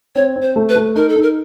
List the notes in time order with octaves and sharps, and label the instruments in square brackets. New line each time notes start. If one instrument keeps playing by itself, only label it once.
[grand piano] C4 [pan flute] C#5
[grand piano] C4
[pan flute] C5
[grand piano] A3
[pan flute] B4
[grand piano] A3
[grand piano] D#4 [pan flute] A#4
[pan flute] A4
[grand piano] D#4
[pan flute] A#4